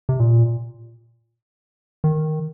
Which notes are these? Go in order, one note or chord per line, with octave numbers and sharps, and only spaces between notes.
C3
A#2
D#3